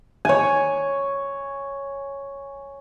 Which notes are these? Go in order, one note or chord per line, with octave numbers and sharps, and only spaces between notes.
C#5 G#5